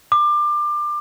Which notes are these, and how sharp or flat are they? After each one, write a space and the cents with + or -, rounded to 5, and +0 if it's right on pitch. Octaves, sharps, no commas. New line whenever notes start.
D6 +25